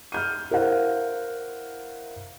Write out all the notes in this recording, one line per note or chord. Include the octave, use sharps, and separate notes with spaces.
F6 G6 D#7
E4 A#4 C5 F5 F#5